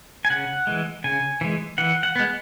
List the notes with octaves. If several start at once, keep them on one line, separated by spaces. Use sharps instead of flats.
G#5
C#3 F#5
E3 G#3
C#3 G#5
E3 G#3
E3 F#5
F#5
G#3 B3